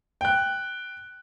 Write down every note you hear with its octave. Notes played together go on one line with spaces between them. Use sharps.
G5 F#6